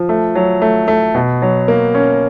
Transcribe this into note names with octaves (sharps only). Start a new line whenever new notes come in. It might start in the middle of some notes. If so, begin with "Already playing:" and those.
Already playing: F3
A3
F#3
A3
A3
B2
F#3
A#3
C#4